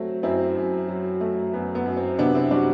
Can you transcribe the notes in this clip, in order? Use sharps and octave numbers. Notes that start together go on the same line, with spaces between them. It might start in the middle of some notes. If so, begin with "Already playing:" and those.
Already playing: F#3 A3 C4
F#2 C4 E4
F#2
F#3
A3
F#2 B3
B3
F#2
C4
C3 B3 D4
C4 E4
G3 D4 F#4